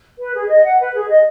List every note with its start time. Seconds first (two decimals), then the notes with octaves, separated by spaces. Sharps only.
0.18 B4
0.33 G#4
0.48 D#5
0.63 F#5
0.79 B4
0.94 G#4
1.08 D#5